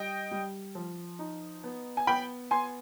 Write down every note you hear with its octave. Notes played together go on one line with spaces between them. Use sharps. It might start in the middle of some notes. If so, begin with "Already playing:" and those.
Already playing: G3 D#5 G5
G3
F3
D#4
B3
G#5
B3 G5 B5
B3 G#5 C6